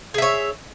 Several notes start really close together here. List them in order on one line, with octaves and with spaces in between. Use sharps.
G#4 E5 C#5